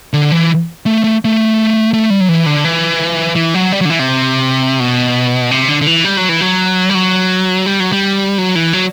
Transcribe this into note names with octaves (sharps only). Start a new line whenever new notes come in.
D3
E3
A3
A3
A3
A3
G3
F#3
E3
D3
E3
E3
F#3
G3
F#3
D3
E3
C3
B2
C3
D3
D3
E3
G3
F#3
E3
F#3
G3
F#3
G3
F#3
G3
F#3
E3
F#3